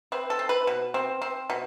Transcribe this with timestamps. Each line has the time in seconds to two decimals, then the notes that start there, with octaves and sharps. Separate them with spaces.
0.12 C4 B4
0.30 A4
0.39 C4
0.49 B4
0.67 B2
0.94 C4
1.22 C4
1.50 B2